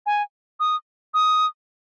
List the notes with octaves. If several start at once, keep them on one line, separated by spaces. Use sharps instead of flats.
G#5
D#6
D#6